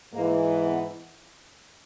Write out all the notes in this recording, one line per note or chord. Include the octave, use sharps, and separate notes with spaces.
G#2 E3 A#3
B3